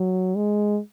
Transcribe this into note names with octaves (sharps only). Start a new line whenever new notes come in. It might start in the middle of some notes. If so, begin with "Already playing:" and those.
Already playing: F#3
G#3